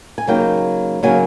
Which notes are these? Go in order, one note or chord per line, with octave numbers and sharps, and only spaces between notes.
G#5
C#3 F#3 A#3 D#4 G5
C#3 F#3 A#3 D#4 G#5